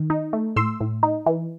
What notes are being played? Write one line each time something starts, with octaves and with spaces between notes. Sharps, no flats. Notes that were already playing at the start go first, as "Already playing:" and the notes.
Already playing: D#3
D#4
A3
A2 C6 E6
A2
D#4
E3